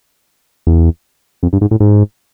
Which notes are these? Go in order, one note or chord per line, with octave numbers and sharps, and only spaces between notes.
E2
F2
G2
G#2
A2
G#2